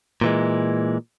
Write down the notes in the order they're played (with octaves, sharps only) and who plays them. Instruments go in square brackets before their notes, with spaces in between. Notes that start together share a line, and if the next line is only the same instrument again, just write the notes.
[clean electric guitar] A#2 E3 G#3